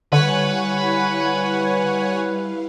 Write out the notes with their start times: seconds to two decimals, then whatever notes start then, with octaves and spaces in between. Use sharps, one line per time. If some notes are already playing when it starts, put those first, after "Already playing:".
0.13 D3 G3 E4 B4 C#5 F5 F#5 G#5